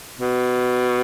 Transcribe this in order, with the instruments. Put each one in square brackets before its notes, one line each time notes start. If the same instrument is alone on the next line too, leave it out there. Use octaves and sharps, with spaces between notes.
[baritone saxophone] B2